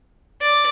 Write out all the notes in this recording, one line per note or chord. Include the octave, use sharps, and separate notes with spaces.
D5